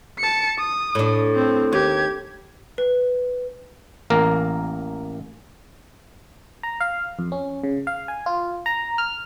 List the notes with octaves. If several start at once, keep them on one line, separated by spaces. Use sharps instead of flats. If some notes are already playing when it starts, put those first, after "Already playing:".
A5 C#7
D#6
A2 D4
C4
D#2 G4 G#6
B4
A1 A#3 A#4
A#5
F5
F2
C#4
C#3
F5
G#5
F4
A#5
F6